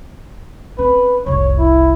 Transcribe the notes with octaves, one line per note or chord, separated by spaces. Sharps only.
C4 C#4 B4
F1 C2 C#5
E4